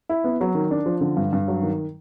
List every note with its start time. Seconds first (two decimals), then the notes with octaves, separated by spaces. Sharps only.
0.09 E4
0.24 B3
0.41 F#3
0.55 D#3
0.71 D4
0.86 F3
1.01 D3
1.17 G2
1.33 G2
1.48 F#3
1.63 D#3